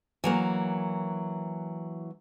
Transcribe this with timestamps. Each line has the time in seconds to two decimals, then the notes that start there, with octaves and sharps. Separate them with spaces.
0.24 E3 F#3 A#3